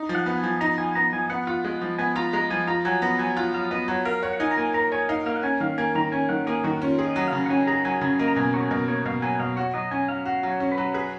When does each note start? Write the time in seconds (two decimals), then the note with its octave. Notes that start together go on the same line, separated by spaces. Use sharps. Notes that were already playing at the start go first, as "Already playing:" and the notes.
Already playing: D#4
0.09 F3
0.15 F#5
0.26 B3 F#5
0.38 G#5
0.44 F3
0.61 D#4 A#5
0.78 F3 G#5
0.95 B3 A#5
1.13 F3 G#5
1.30 B3 F#5
1.47 F4 F#5
1.64 G#3 F#5
1.81 F3
1.98 B3 G#5
2.16 F4 A#5
2.33 G#3 A#5
2.50 F3 G#5
2.67 F4 A#5
2.85 F#3 G#5
3.02 B3 A#5
3.19 F#3 G#5
3.30 G#5
3.37 F4 F#5
3.54 F#3 F5
3.71 B3 D#5
3.88 F#3 C#5
4.05 A#4 F5
4.23 C#5 F#5
4.33 F#5
4.40 D#4 G#5
4.51 A#5
4.57 A#3 G#5
4.74 A#4 A#5
4.92 C#5 G#5
5.09 D#4 F5
5.26 A#3 F5
5.36 F#5
5.43 C#4 G#5
5.60 D#3 F5
5.78 A#3 G#5
5.95 D#3 A#5
6.12 C#4 G#5
6.29 D#3 F#5
6.47 A#3 G#4
6.64 D#3 F#4
6.81 C#4 F4
6.99 G#4
7.05 D#5
7.16 F#3
7.28 C#3 F5
7.46 F#5
7.50 C#4 G#5
7.67 G#4 A#5
7.85 F#3 G#5
8.01 C#3 G#5
8.19 A#3 D#5
8.28 A#5
8.36 B2 G#5
8.53 F#3 C#5
8.63 G#4
8.71 B2 A#4
8.88 A#3 C#5
9.05 B2 F5
9.22 F#3 G#5
9.40 B2 F5
9.56 F#4 C#5
9.74 F#3 D#5
9.91 C#4 G#5
10.08 F#3 F5
10.25 F#4 F5
10.43 F#3
10.49 C#5
10.60 C#4
10.72 B4
10.78 F#3
10.94 G#4 B4